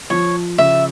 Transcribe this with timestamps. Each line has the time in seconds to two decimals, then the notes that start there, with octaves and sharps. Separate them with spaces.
0.10 F3 C#5
0.58 C#3 E5